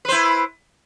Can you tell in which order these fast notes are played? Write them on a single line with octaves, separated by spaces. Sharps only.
B4 C5 E4